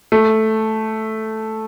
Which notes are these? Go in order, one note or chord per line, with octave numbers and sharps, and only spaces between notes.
A3